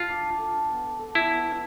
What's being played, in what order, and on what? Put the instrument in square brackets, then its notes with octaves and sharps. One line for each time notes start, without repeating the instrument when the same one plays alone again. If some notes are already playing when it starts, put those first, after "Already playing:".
Already playing: [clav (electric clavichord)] F4 [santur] A4
[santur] D4
E5
A4
D4
B3
A4
A4
[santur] B3 [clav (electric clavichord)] E4
[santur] B3
B3